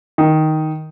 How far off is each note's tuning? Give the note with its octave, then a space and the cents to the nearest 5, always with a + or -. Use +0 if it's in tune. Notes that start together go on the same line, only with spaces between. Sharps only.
D#3 +5